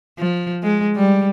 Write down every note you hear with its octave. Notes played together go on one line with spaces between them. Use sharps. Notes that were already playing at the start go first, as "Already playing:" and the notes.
F3
G#3
G3